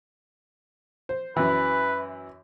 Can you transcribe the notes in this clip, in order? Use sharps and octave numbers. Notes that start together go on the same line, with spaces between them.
C5
F#2 E3 B4